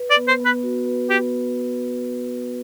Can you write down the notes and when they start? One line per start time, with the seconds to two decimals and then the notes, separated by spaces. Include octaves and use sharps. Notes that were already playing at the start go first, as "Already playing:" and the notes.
Already playing: B4
0.11 D5
0.16 B3
0.28 C5
0.40 B3
0.46 B4
0.63 F#4
0.86 B4
1.10 B3 G4